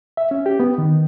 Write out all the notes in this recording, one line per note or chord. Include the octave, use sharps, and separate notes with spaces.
E5
C#4
G4
B3
D#3